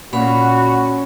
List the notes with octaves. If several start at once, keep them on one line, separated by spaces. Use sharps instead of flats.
A#2 C#4 F#4 B5